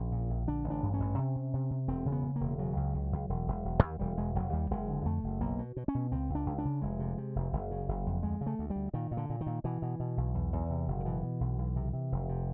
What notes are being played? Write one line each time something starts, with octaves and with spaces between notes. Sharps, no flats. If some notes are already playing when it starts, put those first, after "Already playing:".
Already playing: A#1 C#4
A#2
A#1
D3 D4
A1
D4
G2
C#4
A1
C3
C3
C3
C3
E1 C4
C#3
B3
C#3
E1 A#3
C#3 F#3
C#2
C#2
C#2
E1
E1
E1
D#2
E1 G3
E1 G#3
E1 F#3
D#2 G3
F#1 G#3
D3
F2 A3
F#1
B1 A#3
B2
B2
C#4
B2
C#2 C4
C#2
D4
C#2
D4
C#3
F1 G#3
C3
C3
F1
F#1
C#3
F#1
F2
D2 G#3
C#3
A3
D2
G3
D2
A#2 D#3
A#2
D3
A#2
D#3
A#2
B2 E3
B2
B2
B1
E2
E2
C3
F#1
D#3
B2 E3
B2
B1
B1
C3
C3
F1
C3